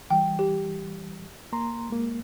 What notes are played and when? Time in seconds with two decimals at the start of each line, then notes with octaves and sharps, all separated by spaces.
0.10 E3 G3 G5
0.39 G4
1.53 A#3 A#5 C6
1.90 G#3 A#3